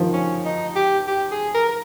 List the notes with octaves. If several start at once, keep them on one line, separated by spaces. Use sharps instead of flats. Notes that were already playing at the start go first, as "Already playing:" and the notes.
Already playing: D#3 F3
C#4
D#4
G4
G4
G#4
A#4
A#4